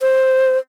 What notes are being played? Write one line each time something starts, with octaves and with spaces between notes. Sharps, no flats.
C5